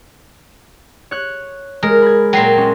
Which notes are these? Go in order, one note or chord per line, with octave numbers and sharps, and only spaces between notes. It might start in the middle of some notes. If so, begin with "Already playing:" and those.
C#5 F#6
G#3 A#4
B5 G#6
A#2 F#3 G5 C7
G#3 C#4 C6